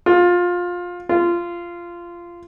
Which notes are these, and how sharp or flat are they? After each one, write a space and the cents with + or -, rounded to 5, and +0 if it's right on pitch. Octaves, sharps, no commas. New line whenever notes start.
F4 +20
F4 -15